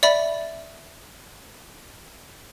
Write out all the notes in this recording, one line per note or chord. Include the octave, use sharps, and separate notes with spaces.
D5 E5 B5